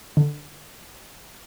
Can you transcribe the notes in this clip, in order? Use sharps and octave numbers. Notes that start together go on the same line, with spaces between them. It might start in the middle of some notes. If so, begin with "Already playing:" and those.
D3